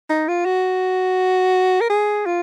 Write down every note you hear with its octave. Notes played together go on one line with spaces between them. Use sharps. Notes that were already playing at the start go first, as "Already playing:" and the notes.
D#4
F4
F#4
A#4
G#4
F4